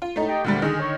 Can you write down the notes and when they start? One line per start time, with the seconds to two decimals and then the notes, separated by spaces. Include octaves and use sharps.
0.02 F4
0.16 A2 A3 D#4
0.28 G4 D#5 G5
0.44 D2 A#2 D3 G3 F#5
0.62 D3 D#3 G#4
0.80 C#5